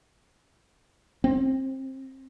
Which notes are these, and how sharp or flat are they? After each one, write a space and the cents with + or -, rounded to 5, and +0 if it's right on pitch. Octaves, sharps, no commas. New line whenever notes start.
C4 +25